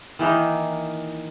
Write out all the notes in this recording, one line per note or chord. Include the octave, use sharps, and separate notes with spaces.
D#3 E3 A#3 D#4